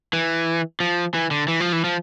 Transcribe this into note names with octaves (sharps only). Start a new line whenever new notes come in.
E3
F3
E3
D3
E3
F3
E3
F3